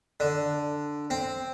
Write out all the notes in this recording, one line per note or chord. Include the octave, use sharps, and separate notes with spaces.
D3
C4